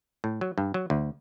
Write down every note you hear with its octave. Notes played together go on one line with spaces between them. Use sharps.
A2
F#3
G2
F#3
D2